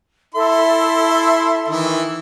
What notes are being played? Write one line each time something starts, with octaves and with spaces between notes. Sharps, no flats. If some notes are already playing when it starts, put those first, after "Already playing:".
E4 A4 E5 C6
D#3 E3 E4